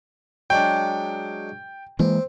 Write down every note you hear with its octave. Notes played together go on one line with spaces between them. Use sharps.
F#3 G#3 D4 G5
E3 G#3 A#3 C4